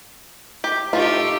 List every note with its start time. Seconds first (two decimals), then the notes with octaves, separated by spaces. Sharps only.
0.64 G4
0.93 A3 D#4 F4 G4